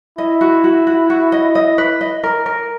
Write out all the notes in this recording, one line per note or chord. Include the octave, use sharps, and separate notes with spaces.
E4 D#5
F#4
F#4
F#4
F#4
D#5
D#5
B4
D#5
A#4
A#4